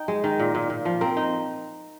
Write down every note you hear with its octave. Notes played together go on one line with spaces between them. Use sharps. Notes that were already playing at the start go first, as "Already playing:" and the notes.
Already playing: D#4 G5
G#3
D#3
A#2
A#2
A#2
F3
C4 A#4
D#4